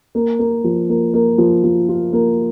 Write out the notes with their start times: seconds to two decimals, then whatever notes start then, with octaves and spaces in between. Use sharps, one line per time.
0.15 A#3
0.39 A#3
0.64 F3
0.89 A#3
1.14 A#3
1.38 F3
1.64 F3
1.89 F4
2.13 A#3